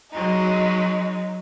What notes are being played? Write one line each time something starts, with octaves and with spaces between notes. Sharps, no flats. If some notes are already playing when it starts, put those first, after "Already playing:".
F#3 G#3 D#4